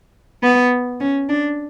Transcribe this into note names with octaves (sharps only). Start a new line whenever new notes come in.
B3
C#4
D4